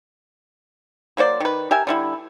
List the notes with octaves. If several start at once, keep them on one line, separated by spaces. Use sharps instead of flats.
F#3 A#3 C5 D5
D#3 B4
G4 A#4 E5 G#5
D3 G3 E4